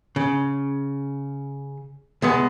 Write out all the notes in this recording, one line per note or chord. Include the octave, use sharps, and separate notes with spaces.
C#3
C2 G#3 B3